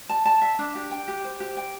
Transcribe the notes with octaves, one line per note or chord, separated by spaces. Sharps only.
A5
A5
E5
D4
G4
G5
G4
C5
G4
G5